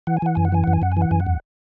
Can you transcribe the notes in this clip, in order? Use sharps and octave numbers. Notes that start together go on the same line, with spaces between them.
E3 F#5
G#5
E3 F#5
F#2 G#5
F#5
E3 G#5
F#2 F#5
G#5
F#2 F#5
G#5
E3
F#5
F#2 G#5
F#5
E2